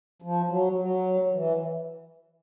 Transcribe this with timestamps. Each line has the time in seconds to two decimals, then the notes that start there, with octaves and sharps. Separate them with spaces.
0.22 F3
0.49 F#3
0.78 F#3
1.33 E3